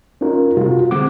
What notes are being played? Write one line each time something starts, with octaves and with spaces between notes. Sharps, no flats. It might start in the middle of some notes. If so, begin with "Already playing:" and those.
C#4 D#4 F4 A#4
C3 G3 F4 F#4
D3 G#3 C4 F#5 D6